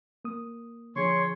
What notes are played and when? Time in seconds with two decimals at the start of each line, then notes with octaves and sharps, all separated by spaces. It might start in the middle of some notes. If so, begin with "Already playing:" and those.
0.25 A#3 D#6
0.96 D3 F3 G#4 C#5 C6 C#6